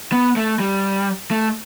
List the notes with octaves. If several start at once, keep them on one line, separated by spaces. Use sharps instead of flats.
B3
A3
G3
A3